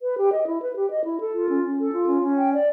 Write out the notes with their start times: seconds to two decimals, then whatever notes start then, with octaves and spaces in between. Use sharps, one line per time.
0.01 B4
0.17 G4
0.31 D#5
0.46 E4
0.61 B4
0.76 G4
0.90 D#5
1.05 E4
1.19 A4
1.33 F4
1.49 C#4
1.64 C#4
1.78 A4
1.93 F4
2.07 C#4
2.22 C#4
2.37 G5
2.52 D5